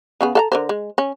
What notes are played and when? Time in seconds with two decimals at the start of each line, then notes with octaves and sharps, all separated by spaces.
0.21 C#3 B3 G#4
0.35 A4 F5 A#5
0.52 D3 A#4 C5
0.69 G#3
0.98 C#4